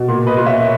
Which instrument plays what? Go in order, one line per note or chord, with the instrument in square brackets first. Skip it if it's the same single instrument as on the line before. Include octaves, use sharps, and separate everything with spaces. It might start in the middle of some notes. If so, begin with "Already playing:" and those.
Already playing: [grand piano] B2
A#2
B4 D#5
A#2
C#5 E5